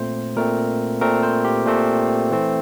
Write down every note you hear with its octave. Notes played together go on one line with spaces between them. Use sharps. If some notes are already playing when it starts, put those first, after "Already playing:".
Already playing: A#2 A3 C4 C5
A#2 A3 C4 A#4
A#2 A3 C4 A#4
C5
G4
A#2 A3 C4
E3 A3 C4